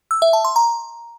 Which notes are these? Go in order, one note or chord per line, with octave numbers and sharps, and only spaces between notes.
E6
E5
A5
C6
A#5